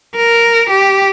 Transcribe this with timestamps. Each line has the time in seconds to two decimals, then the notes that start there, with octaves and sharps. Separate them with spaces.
0.16 A#4
0.70 G4